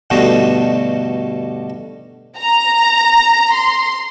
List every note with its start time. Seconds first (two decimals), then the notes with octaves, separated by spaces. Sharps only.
0.10 G2 B2 D3 A3 D#4 F#4
2.40 A#5
3.53 C6